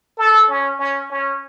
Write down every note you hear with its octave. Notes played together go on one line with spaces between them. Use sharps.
A4
C#4
C#4
C#4